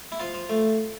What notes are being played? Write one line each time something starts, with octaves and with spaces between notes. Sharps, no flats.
E4
F3 F4
F3
A3